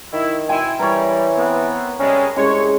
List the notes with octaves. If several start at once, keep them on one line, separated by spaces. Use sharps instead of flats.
D#3 E4
B2 E4 G5 G#5 C6
E3 G3 A#4 C#5
B3 C4
C3 G3 G#3 C#4
C2 G#3 C#4 C#5